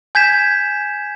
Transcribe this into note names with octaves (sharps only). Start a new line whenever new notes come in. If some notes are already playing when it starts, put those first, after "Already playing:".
G#5 G6 G#6 B6 E7